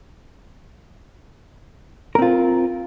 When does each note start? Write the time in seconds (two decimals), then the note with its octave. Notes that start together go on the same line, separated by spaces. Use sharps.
2.15 A#4
2.19 C4
2.22 F4